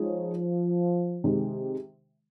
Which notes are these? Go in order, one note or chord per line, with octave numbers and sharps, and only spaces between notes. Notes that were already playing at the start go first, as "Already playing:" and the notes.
Already playing: F3 G#3 D#4 G#4 C#5
C3 D#3 G#3